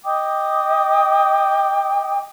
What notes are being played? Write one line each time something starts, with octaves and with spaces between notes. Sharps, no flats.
D#5 G5 D6 D#6